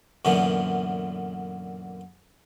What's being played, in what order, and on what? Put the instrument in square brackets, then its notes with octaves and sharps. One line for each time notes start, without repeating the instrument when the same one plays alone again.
[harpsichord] F#2 A#2 D3 E3 B3